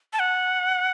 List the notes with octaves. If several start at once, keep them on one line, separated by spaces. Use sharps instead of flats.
A5
F#5